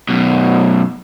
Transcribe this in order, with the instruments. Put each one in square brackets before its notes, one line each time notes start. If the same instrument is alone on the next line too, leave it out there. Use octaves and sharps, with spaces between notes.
[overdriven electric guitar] F#2 B2